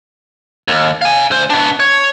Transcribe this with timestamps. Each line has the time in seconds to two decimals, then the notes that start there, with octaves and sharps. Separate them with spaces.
0.68 D#2
1.02 F5 G#5
1.31 D2 C5
1.50 B3 D4
1.80 C#5